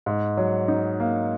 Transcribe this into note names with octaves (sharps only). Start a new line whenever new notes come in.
G#2
F#3
D#4
A#3